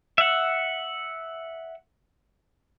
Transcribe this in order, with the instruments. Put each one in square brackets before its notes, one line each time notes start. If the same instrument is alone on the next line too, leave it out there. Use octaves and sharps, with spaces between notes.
[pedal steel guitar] E5 F#5